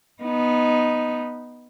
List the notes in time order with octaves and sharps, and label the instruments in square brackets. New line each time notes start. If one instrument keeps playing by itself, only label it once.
[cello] B3 D#4